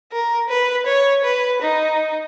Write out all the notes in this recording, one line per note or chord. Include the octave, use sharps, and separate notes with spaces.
A#4
B4
C#5
B4
D#4